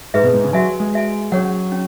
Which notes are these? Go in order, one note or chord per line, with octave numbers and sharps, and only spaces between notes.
G#2 G#4 B4 E5
B2
G#2
C#3
F#3 F#4 E5 G#5
G#3
F#4 E5 G#5
F#3 C#4 G#4 C#5 F#5
C#4